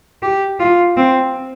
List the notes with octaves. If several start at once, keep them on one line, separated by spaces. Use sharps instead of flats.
G4
F4
C4